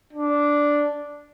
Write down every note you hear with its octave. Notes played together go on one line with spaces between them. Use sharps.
D4